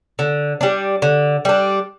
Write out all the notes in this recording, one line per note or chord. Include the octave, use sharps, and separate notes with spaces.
D3
G3 D4
D3
G3 D4